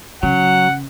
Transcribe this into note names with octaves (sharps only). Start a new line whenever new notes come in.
C#3 F#3 F#5